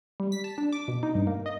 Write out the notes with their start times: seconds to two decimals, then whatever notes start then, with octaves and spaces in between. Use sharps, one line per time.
0.20 G3
0.32 B6
0.44 A5
0.58 D4
0.73 D6
0.88 B2
1.03 D#4
1.15 G2
1.27 A#3
1.46 D#5